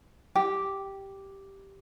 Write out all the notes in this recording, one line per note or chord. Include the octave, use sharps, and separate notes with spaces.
G4